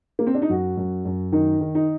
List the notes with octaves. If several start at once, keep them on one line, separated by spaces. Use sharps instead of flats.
A#3
C4
D4
D#4
F#2 F#4
F#2
F#2
D#3 D#4
D#3
D#4